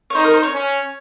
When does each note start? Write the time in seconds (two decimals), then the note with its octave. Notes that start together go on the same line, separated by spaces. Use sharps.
0.10 C#5
0.15 D#4 C5
0.24 A#4
0.34 C5
0.43 C#5
0.54 C#4